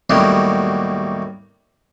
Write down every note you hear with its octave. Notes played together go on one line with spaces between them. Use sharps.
D#2 A2 F#3 G3 A#3 B3